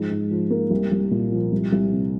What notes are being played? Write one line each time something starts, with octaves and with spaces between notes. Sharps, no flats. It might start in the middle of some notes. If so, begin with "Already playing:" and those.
Already playing: G#2 F3
G#2
F3
A#3
C2
C2
A#2
F3
C2
C2
C3